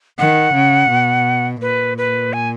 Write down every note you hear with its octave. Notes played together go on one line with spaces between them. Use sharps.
D#3 F#5
C#3
B2
A#2 B4
B4
G#5